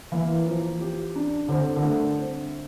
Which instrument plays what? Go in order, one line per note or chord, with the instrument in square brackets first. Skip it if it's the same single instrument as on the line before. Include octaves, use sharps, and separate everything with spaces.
[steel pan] E3 [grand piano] A#3
[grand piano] F3
G4
D4
[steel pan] D3 [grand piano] C4
[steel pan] D3
[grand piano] A3
C4